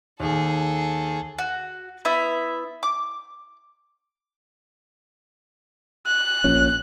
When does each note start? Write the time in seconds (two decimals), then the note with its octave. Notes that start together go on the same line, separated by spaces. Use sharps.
0.20 D#2 G#4 A4
1.38 F#4
2.05 B3 E4 E5
2.83 D6
6.07 F#6
6.44 A#1 A#2 C#4